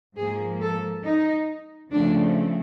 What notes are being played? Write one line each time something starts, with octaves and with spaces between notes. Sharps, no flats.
G#2 F3 A#3 G#4
A4
D#4
C#3 F3 A3 C4 D4